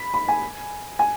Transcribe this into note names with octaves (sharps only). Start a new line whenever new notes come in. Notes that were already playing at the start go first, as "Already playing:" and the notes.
Already playing: B5
B5
G#5
G#5